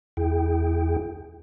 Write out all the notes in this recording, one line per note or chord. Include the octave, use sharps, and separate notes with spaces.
E2 E4 G#4 G5